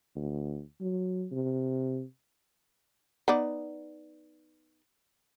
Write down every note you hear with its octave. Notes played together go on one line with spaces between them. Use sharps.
D2
F#3
C3
B3 D#4 D5